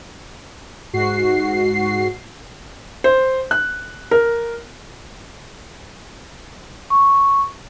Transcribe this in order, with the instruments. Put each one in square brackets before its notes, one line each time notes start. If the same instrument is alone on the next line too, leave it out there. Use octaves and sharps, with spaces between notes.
[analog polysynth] G#2 F#4 C7
[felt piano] C5
F#6
A#4
[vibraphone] C#6